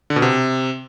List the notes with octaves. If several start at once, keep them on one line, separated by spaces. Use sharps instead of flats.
D3
B2
C3